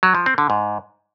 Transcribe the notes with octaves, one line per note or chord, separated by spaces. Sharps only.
F#3
F3
C4
D3
G#2